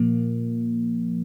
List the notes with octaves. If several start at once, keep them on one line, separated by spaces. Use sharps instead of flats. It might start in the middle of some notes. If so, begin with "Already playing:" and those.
Already playing: A#2 F3 A#3